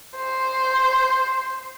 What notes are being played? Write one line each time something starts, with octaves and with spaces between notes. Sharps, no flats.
C5